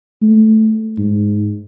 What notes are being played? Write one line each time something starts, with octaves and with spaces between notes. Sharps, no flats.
A3
G#2